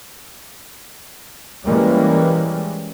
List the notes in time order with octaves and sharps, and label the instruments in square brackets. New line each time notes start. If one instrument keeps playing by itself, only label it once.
[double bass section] E3 G3 G#3 A#3 C#4